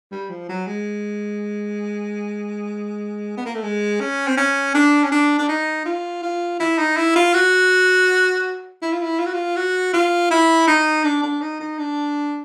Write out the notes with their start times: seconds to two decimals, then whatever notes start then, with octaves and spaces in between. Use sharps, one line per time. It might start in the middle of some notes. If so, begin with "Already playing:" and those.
0.11 G3
0.30 F3
0.49 F#3
0.67 G#3
3.37 B3
3.46 A#3
3.55 A3
3.63 G#3
4.00 C#4
4.28 C4
4.37 C#4
4.74 D4
5.04 C#4
5.11 D4
5.39 D4
5.48 D#4
5.85 F4
6.23 F4
6.60 E4
6.78 D#4
6.97 E4
7.16 F4
7.34 F#4
8.82 E4
8.93 F4
9.03 E4
9.19 F4
9.26 F#4
9.33 F4
9.56 F#4
9.93 F4
10.30 E4
10.68 D#4
11.04 D4
11.23 D4
11.41 D#4
11.60 D#4
11.78 D4